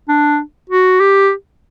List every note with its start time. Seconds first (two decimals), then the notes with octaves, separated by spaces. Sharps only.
0.09 D4
0.69 F#4
1.00 G4